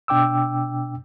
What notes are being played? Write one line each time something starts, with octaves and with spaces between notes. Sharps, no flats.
B2 D4 G5 D6 E6